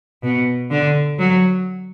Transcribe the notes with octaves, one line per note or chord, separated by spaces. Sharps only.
B2
D3
F#3